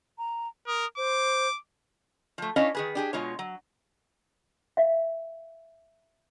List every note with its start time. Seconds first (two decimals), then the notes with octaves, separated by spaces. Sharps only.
0.18 A#5
0.67 A#4 D#6
0.97 C5 D6
2.38 F3 A3
2.56 C#4 D4 E4 C#5 D#5 F5
2.75 D#3 G#4 B4
2.95 D4 G4 G#4
3.13 B2 G#3 F4 C#5
3.39 F#3
4.77 E5 F5